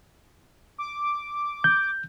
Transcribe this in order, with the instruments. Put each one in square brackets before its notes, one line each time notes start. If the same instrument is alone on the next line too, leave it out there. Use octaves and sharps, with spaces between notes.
[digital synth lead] D6
[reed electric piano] G6